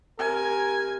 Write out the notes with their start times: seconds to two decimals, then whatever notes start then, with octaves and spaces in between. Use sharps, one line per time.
0.19 C3 A#4 G#5